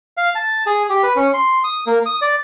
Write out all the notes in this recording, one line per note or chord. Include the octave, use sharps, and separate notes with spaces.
F5
A5
G#4
G4
B4
C#4
C6
D#6
A#3
D#6
D5